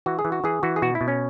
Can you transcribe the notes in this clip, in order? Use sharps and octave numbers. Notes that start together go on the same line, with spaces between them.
E3 F#4
G#4
E3
F#4
E3 G#4
E3 F#4
G#4
B2 F#4
E4
B2
C#4